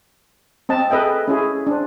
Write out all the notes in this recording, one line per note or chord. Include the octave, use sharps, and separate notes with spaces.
C4 D#5 A5
G#4 A4 B4 D#5 E5 G5
C#4 E4 G#4
D4 C5